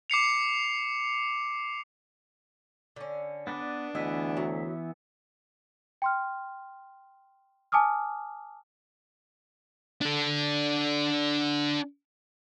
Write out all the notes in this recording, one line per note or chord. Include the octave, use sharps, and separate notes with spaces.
D6 C7 C#7 F7
D3 C#4
B3 D4 B4 D5
D2 E3 B3 D#5 E5
F#3
G5 C6 F6
G#5 A5 D6 D#6 F6
D4 A4